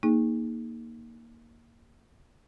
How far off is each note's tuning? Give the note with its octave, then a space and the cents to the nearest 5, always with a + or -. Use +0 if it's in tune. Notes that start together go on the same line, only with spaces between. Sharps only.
A#3 +0 D#4 +0 G#4 +0